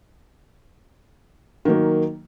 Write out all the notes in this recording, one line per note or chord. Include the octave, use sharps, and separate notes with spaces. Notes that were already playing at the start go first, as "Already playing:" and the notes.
D#3 F#3 A#3